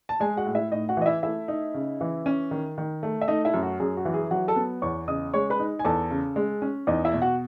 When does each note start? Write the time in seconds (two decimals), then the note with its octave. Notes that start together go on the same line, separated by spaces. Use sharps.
0.09 A5
0.20 G#3 G#4 G#5
0.37 F#4 F#5
0.46 A2
0.55 E4 E5
0.71 A2 D#4 D#5
0.89 F#4 F#5
0.97 E3 D#5
1.06 E4 E5
1.23 A3 E4 E5
1.48 D#4
1.74 C#3
2.01 E3
2.26 C#4
2.51 D#3
2.78 D#3
3.03 A3
3.21 E5
3.28 A3 D#4 D#5
3.45 E4 E5
3.54 F#2
3.62 F#4
3.80 F#2 G#4
3.97 F#4
4.05 E3
4.14 G#4
4.31 F#3 F#4 F#5
4.48 A4 A5
4.56 B3
4.82 E2 C#5 C#6
5.08 C#3 D#5 D#6
5.34 G#3 C#5 C#6
5.50 B4 B5
5.59 D#4
5.79 G#5
5.85 E2 A4 A5
6.11 C#3
6.36 G#3
6.62 C#4
6.87 E2 D#4 D#5
7.05 E4 E5
7.13 B2
7.22 F#4 F#5